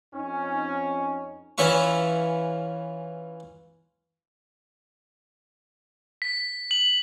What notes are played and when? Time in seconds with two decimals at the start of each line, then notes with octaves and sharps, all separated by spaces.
0.14 F2 C#4 D#4
1.58 E3 C#4 F4 E5 C#6
6.22 B6
6.71 F#7